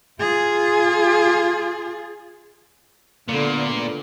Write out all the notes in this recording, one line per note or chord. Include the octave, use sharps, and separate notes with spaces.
F4 G#4
A#2 D3 A3 B3